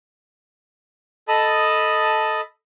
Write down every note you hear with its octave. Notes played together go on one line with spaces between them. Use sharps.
A4 D#5 A5 B5 D#6